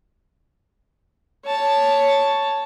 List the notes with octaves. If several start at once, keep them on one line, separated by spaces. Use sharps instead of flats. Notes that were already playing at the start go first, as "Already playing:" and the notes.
C#5 A5